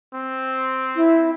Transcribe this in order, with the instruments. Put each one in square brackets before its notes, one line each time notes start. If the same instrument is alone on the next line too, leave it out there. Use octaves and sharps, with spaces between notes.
[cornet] C4
[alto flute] E4